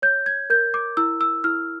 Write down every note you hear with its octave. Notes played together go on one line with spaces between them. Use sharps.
C#5 G6
G#6
A#4 G6
D6
E4 E6
E6
E4 F6